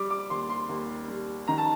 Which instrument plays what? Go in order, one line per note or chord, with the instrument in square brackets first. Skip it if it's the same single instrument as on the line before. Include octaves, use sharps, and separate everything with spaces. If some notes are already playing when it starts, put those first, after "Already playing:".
Already playing: [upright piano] G3 D6
D6
D#2 C6
C6
D#2
G3
D#3 A#5
A5